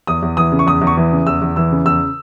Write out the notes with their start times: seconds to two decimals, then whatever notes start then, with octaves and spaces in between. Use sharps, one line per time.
0.07 E2 D#6
0.22 E2
0.37 E3 D#6
0.52 C#3
0.59 C#6
0.66 E2 D#6
0.81 E2
0.87 C#6
0.97 E3
1.12 C#3
1.27 E2 E6
1.41 E2
1.56 E3 E6
1.72 C#3
1.85 E2 E6